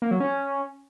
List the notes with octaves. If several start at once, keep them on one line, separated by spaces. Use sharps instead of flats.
A#3
F#3
C#4